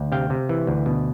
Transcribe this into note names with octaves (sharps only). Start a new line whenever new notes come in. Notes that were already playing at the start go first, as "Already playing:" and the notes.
Already playing: D2
C3 F5 G5
C3
E3
D2
B2